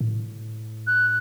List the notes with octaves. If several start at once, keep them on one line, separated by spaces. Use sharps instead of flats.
A2
F#6